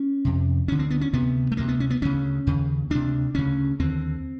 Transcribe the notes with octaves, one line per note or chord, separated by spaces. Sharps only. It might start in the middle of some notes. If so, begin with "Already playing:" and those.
Already playing: C#4
F2 C3
D2 D3 C#4
C4
B3
C#4
D2 C3 B3
A3
D2 C3 A#3
B3
C#4
B3
D2 C#3 C#4
D#2 C#3
D2 C3 D4
D2 C#3 C#4
D#2 D3 C4